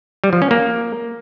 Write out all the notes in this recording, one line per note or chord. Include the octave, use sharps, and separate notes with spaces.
G3
F3
C#4
A#3